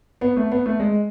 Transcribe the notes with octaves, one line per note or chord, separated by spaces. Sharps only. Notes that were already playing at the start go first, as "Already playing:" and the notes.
B3
A3
B3
A3
G#3